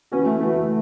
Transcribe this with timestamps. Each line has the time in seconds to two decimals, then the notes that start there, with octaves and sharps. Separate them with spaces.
0.12 E3 B3 C#4 F#4
0.26 A3
0.40 E3 A3 B3 F#4